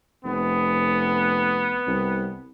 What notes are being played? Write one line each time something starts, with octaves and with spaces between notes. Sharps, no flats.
F1 B3
C2